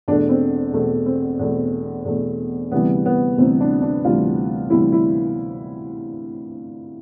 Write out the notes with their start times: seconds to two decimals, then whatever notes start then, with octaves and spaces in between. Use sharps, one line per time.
0.08 E2 B2 A3 D4
0.29 C4
0.73 E2 B2 A3
1.06 C4
1.39 E2 B2 A3
2.05 E2 B2 A3
2.72 D2 C3 E3 G3 B3
3.06 B3
3.38 D2 C3 E3 G3 C4
3.61 D4
3.82 D4
4.05 D2 C3 E3 G3 F4
4.70 D2 C3 E3 G3 E4
4.92 E4